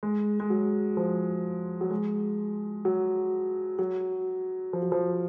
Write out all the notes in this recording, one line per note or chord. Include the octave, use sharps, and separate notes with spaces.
G#3
G#3
F#3
F3
F#3
G#3
F#3
F#3
F3
F#3
F3